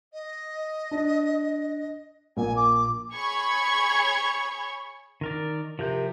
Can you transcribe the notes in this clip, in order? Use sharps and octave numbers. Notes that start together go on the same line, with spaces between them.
D#5
D4
A#1 A#3 G#5
D6
G#4 C#5 B5 C#6 G#6
D#3 A#4 D5
C3 F3 A#4 G6